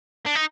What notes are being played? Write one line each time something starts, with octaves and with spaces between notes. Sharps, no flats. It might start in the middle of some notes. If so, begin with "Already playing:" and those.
D4
D#4